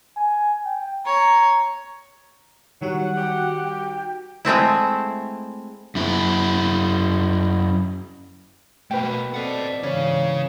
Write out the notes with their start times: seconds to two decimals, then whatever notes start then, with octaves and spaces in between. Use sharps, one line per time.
0.17 G#5
0.65 G5
1.05 C#5 A#5
2.81 D#3 F#3 G3 F#4 F#5
3.17 G4 G5
3.56 G5
4.45 G#3 A3 C4 E4
5.95 F#2 E4
8.91 B2 A3 A#3 B4 G5
9.34 C4 A4 D5 D#5 F#5
9.83 G#2 C#3 E3 C#4 F5